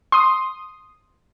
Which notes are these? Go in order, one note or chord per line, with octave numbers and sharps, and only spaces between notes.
C6 D#6